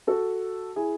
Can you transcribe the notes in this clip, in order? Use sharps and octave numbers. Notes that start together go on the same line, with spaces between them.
F#4 A4
E4 G#4